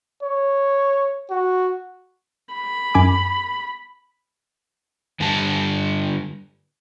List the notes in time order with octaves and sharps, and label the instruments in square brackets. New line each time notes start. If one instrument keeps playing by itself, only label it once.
[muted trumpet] C#5
F#4
[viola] B5
[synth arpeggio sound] F#2 G#5 D6
[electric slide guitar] G2 D3 G3 A5